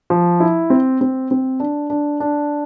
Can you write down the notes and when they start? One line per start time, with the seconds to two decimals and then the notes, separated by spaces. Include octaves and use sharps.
0.10 F3
0.40 E4
0.70 C4
1.01 C4
1.31 C4
1.60 D4
1.90 D4
2.20 D4